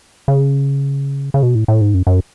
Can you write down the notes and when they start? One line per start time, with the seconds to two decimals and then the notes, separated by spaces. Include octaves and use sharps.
0.28 C#3
1.34 C#3
1.43 B2
1.55 A2
1.68 A2
1.81 G#2
1.94 F#2
2.07 F#2